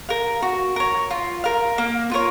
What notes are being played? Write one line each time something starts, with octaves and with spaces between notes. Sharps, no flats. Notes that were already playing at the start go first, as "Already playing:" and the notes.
A#4 F5
F#4
A#4 C#5
F4
A#4 F5
A#3
F4 A#4 C#5